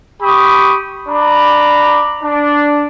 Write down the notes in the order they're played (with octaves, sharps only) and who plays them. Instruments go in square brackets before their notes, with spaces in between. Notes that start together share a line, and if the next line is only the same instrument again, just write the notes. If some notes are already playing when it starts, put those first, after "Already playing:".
[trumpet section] G4 B5 C#6 D#6
D4 A#5 B5 D6
D4